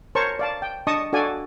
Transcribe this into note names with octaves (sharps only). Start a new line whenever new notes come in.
A#4 C5 C#5 A5 A#5 C#6
D5 F5 A5
G5
D4 D#5 A5 C#6 D#6
D4 F#4 A4 D5 F5 G#5